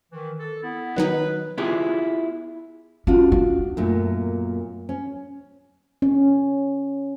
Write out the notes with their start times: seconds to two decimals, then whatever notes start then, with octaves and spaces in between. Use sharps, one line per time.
0.12 D#3 E3
0.40 A4
0.63 B3 E4
0.96 D#3 F#3 D#4 B4
1.58 B3 E4 F4 G4 G#4
3.07 C#4 D4 F4 F#4
3.32 B3
3.77 F#2 A#2 A3
4.89 C#4
6.02 C#4